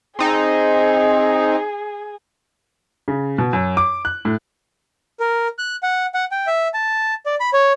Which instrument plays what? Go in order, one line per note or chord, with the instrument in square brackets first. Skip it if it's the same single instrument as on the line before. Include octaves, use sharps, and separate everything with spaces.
[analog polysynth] C4 D#4 [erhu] G#4
[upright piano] C#3
B2
F#2
D6
F#6
A2
[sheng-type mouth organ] A#4
F#6
F#5
F#5
G5
E5
A5
D5
B5
C#5